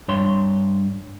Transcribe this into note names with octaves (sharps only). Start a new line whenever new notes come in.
G2 C#5 C6